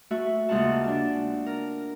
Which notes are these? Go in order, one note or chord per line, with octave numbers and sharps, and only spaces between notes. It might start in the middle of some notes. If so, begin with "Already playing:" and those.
A3 F#4 E5
D#2 C#3 G#3 F4 F#5 A5
D4 A5
A#4